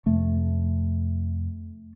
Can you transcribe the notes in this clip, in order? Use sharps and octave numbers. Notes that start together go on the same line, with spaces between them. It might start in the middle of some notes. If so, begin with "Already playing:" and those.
F2 C3 A3